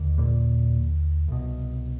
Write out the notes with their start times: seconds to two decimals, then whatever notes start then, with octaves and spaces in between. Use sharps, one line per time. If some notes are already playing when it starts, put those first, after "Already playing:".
Already playing: D#2 D3
0.18 A#2 A#3
1.28 C2 B2